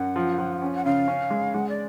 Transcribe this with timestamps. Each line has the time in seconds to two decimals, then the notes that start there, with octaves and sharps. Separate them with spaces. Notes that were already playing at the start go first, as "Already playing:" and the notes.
Already playing: F#2 F#5
0.16 F3
0.38 F3
0.62 C#4
0.75 F#5
0.85 C#3 F5
1.08 C#4
1.30 G#3
1.54 G#3 F#5
1.69 D5